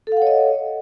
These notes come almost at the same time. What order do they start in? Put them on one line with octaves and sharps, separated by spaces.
A4 F5 F#5 C#5 D#5